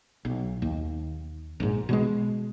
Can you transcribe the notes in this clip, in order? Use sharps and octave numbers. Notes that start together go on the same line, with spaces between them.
B1
D#2
A#1 G#2
B2 F#3 G#3